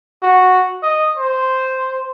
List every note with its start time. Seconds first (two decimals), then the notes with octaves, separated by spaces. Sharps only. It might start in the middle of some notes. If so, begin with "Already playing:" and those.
0.23 F#4
0.83 D#5
1.17 C5